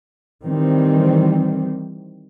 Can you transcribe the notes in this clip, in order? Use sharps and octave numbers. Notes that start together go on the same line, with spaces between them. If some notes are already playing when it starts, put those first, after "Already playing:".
D#3 E3 G3 C4